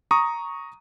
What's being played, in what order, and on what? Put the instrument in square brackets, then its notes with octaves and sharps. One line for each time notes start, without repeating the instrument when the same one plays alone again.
[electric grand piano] A#5 C#6 D#6